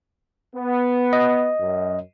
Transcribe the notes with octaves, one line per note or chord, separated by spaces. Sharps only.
B3
D#5
F#2